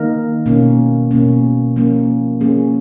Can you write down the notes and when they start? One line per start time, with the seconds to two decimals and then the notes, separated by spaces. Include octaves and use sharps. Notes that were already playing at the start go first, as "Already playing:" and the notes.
Already playing: D#3 A#3 D#4 A#4
0.46 B2 A#3 C#4
1.11 B2 A#3 C#4
1.76 F3 A#3 C#4
2.41 F3 A#3 C#4 G#4